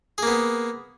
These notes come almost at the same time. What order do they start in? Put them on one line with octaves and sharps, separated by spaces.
G#4 A#3 B3